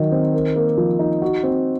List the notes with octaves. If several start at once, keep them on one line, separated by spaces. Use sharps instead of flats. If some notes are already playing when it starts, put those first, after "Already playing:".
Already playing: D#3 F#3 D#4
C4
A#4
A#3
F3
D#4
F#4
C4